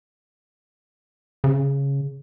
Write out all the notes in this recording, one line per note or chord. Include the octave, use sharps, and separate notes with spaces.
C#3